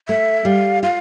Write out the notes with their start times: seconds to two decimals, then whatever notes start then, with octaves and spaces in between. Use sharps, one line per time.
0.08 A3 E5
0.45 G3 F5
0.83 F4 F5